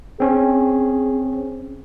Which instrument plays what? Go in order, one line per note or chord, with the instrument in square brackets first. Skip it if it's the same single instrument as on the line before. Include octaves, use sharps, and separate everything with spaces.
[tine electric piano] C4 C#4 [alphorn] G#4